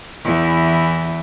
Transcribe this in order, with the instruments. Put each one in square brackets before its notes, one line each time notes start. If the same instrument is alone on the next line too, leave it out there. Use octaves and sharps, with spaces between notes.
[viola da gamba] E2 E3